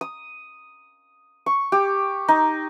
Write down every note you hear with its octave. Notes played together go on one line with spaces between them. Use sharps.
D#6
C#6
G4
D#4